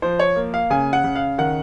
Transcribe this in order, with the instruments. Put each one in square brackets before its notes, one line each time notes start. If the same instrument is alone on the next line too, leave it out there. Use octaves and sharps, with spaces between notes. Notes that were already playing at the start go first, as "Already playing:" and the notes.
[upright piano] F3 C5
C#5
A#3
F5
C#3 G#5
F#5
C#3
F5
D#3 F#5